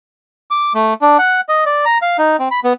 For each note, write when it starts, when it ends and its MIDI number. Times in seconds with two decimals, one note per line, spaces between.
0.51 0.73 86
0.74 0.94 57
1.02 1.17 62
1.19 1.41 78
1.49 1.64 75
1.66 1.85 74
1.86 1.98 82
2.02 2.17 77
2.18 2.37 63
2.39 2.49 60
2.51 2.60 83
2.64 2.73 59